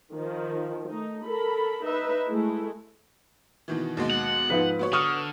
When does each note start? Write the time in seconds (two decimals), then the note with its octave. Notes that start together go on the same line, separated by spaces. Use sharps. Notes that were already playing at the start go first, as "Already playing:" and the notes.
0.13 D#3 F3
0.87 A3 D#4
1.25 A4 A#4 B5
1.84 D#4 B4 E5
2.28 G#3 A3 E4
3.68 B2 D#3 E3
3.97 D#2 B2 G#3
4.11 F#5
4.50 G#2 F3 B4
4.79 B3 F#4 C#5
4.93 D3 C#6 D#6 F6